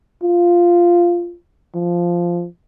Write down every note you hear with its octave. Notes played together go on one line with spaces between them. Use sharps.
F4
F3